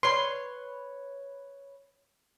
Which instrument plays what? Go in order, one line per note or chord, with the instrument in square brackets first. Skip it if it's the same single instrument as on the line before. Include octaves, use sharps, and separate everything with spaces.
[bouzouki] B4 C#5 [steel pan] C6